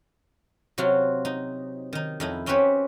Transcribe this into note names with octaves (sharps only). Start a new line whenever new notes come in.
C3 F#3 F4 F#4
D#4
D#3 D#4
F2 D#4 E4
C4 C#4 F#4 G4 B4 C#5